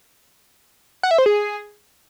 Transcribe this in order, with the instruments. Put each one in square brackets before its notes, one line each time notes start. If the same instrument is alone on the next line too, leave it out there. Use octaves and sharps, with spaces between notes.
[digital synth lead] F#5
E5
C5
G#4